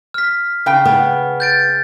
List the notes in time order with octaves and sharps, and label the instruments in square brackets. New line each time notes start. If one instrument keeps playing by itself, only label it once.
[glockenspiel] F6 B6
[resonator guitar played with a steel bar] C#3 G5
[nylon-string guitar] B3
[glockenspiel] G6 A6 D7